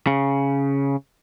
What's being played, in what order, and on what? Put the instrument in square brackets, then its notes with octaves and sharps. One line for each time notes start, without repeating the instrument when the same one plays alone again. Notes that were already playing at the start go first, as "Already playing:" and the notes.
[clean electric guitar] C#3